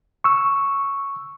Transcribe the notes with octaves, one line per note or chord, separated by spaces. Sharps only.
C#6 E6